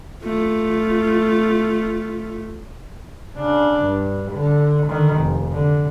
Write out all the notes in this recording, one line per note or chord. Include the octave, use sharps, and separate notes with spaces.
A3 F4
C#3 D4
G2
D3
D3 D#3
F1
D3